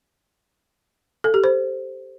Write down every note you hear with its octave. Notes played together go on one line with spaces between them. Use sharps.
A4
G4
C5